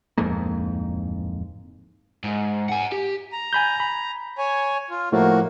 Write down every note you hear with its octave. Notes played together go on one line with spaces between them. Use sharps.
D1 F2 G#2 A#3
G#2
F#5 G#5
G4
A#5
G#5 B5 G6
B5
C#5 G#5
F4
A2 F3 A3 A#3 F#4